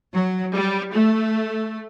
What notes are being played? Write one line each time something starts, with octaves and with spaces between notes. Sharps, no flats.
F#3
G3
A3